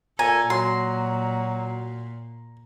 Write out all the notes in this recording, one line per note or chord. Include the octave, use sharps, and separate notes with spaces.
A#2 A4 G#5 A#5
A#2 F#3 C6